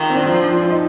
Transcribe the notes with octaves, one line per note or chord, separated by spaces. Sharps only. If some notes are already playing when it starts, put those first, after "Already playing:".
Already playing: D#3 F4
C4
D4
F3
D4
D#4